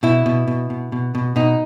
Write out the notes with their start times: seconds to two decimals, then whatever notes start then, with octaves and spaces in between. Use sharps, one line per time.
0.03 B2 E4
0.26 B2
0.48 B2
0.70 B2
0.92 B2
1.15 B2
1.36 B2 D#4